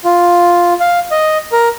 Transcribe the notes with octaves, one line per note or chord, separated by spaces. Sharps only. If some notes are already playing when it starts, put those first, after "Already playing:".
F4
F5
D#5
A#4